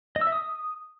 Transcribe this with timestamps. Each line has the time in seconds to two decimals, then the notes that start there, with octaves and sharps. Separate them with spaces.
0.16 D#5
0.21 E6
0.27 E5
0.32 D#6